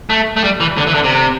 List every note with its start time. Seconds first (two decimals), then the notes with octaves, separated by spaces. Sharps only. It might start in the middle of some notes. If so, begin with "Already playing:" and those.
0.10 A3
0.36 A3
0.44 G3
0.60 E3
0.78 D3
0.87 E3
0.94 D3
1.04 C3